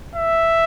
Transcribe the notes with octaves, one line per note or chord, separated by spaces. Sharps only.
E5